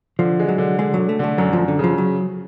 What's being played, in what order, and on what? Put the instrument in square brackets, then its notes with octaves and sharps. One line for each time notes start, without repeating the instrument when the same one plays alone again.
[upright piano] D3 [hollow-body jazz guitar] F3
[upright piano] G#3
[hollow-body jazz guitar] F#3
[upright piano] D3
[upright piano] D3 [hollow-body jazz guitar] G#3
[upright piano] D3 [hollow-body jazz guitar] F#3
[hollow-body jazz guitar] A3
[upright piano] D3 [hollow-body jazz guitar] A3
[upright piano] F#2 [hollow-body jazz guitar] F#3
[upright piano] F#2 [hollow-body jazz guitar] F3
[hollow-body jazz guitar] D3
[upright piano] C#3 [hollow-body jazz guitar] F3
[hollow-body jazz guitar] F#3